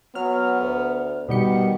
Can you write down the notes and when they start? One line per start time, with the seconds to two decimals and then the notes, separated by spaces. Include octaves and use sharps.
0.15 F#3 B3 F6
0.60 D2
1.29 B2 D#3 G3 B3 C#7